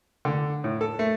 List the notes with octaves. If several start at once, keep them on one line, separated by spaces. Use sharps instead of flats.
D3
A2
A4
A3